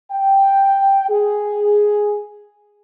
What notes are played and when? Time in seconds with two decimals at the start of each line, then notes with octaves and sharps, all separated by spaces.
0.12 G5
1.10 G#4